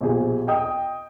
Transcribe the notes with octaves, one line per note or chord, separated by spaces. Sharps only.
A#1 B2 G4 G#4
D#5 G5 D#6